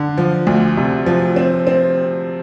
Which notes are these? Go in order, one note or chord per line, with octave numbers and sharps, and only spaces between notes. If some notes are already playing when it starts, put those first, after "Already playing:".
Already playing: D3
F3
D2
C3
F3
C4
C4